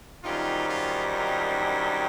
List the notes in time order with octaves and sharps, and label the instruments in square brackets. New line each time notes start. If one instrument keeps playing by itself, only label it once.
[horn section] F#2 D#3 G3 C4 D#4 F4
F4
F4
E4